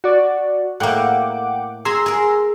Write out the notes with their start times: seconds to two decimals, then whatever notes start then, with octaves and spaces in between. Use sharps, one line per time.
0.04 F#4 D5
0.80 A2 A#3 F#5 G5 D6
1.85 G#4 G#5 A#5 C6 E6
2.06 G#4 A#4